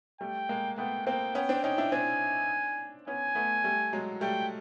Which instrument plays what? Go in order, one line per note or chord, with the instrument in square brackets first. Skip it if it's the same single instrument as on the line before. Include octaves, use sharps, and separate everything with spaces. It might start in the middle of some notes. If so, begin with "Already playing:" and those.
[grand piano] G3 A3 [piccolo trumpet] G5
[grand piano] G#3 A#3
[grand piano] A3 B3 [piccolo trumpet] G5
[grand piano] A#3 C4 [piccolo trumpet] G5
[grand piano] B3 C#4 [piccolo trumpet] G5
[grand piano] C4 D4
[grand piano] C#4 D#4 [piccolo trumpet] G5
[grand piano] D4 E4
[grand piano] C4 D4 [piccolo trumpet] G#5
[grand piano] B3 C#4 [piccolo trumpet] G#5
[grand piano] A3 B3
G3 A3
F#3 G#3
[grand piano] G3 A3 [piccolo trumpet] G5